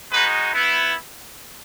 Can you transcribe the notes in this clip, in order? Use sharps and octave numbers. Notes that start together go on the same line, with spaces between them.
G#3 D#4 F#4 B4
B3 E4